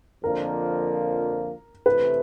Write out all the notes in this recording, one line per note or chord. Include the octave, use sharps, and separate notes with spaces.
F2 D3 F3 A#3 A#4
C3 E3 A3 B4